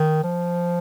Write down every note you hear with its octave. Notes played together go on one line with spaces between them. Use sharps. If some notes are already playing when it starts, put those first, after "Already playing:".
Already playing: D#3
F3